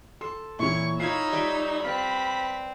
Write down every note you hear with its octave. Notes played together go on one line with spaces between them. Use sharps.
A4 A5 C6
A#2 E3 E4 C#5 C#6
D#4 F4 C#5 B5 E6 G#6 C7
G3 E5 G5
C4 B4 D5 F5 A5 B5